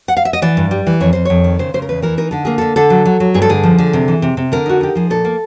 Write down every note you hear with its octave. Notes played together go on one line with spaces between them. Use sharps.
F#5
F5
E5
D#5
E3 D5
G2
G3
E3
F2 C#5
F2 C5
F2 C#5
D#3
C#3 C5
C#3 C5
A#4
E2 B4
E3 A#4
D#4 A#4
D3 A4
A#3 G#4
D3 A4
D3 A4
F#3
F#3
F#3
G2 G#4
A4
D3 G#4
F3
D3
C3
E3
C3
C3
D3 A#4
D#4 F#4
D#4 G4
F3 G#4
A#2 A4
A#3